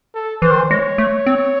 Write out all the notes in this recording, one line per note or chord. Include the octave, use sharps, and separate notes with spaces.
A4
E3 C5
D#3
E3
G#3 C#5
A3
C4